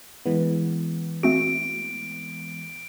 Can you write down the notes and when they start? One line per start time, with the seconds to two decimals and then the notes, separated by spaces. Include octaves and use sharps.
0.25 E3 G#3 B3
1.23 A3 C4 F#4 D7